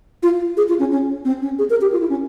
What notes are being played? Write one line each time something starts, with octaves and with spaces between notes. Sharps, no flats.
F4
G#4
F4
C#4
C#4
C4
C#4
G#4
A#4
G4
F4
E4
C#4